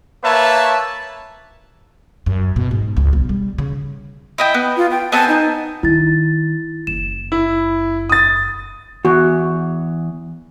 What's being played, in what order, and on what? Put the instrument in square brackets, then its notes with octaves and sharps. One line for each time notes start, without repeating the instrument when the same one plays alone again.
[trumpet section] A#3 B4 C#5 E5 A5
[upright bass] F#2
B2
G#2
C#2
B1
G3
C#3
[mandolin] E4 D#5 G5
B3
[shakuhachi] F4
G5
[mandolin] B3 C4 G#5 [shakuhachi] A5
[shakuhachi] D#4
[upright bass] D#3 [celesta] E4 A6
[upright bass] F#1 [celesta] E7
[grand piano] E4
D#6 A6
[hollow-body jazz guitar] E2 [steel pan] F#4